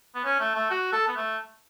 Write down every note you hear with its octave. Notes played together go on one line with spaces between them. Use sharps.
B3
C#4
A3
A3
F#4
A4
B3
A3